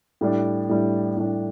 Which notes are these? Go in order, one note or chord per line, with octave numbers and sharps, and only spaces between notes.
A2 G3 D4
A2 G3 D4
A2 G3 D4